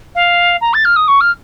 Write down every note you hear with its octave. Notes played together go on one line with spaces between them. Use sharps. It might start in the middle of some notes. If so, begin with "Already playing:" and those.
F5
A#5
A6
F6
D#6
C#6
F6